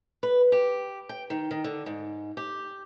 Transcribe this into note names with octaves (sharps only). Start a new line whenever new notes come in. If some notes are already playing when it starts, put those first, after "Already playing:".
B4
G4
G5
D#3
D#3
D3
G#2
G4